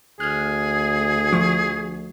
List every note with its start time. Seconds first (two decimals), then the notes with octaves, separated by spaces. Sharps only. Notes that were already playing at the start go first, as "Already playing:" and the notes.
0.20 D2 G#4 F6 F#6
1.33 F3 C#6